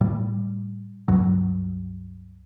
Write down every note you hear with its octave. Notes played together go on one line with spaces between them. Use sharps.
A2 G3
C#2 G2 F#3